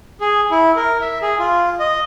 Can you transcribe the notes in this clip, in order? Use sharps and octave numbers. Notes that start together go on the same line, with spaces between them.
G#4
E4
A#4
E5
G#4
F4
D#5